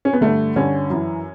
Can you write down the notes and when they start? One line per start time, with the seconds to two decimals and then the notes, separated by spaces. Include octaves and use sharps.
0.05 C#4
0.13 B3
0.21 G2 D3 A3
0.56 G2 D3 C#4
0.90 F#2 E3